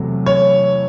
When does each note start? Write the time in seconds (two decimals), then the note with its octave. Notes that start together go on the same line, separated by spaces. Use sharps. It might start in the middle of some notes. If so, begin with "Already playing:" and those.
Already playing: E2 C3 F#3 A3
0.26 C#5